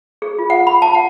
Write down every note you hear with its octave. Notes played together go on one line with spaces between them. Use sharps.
G#4
F4
F#5
B5
A5
F#5